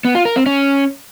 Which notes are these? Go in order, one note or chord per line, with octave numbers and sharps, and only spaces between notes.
B3
F4
A#4
C4
C#4